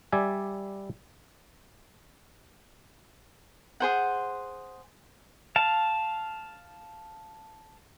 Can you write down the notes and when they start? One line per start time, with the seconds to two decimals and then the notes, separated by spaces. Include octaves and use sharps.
0.12 G3 D5 E5 G#5
3.80 G#4 C5 F#5
5.56 F5 A5